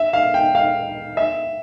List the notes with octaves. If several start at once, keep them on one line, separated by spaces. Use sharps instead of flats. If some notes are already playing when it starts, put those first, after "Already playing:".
Already playing: E5
F5
G5
F5
E5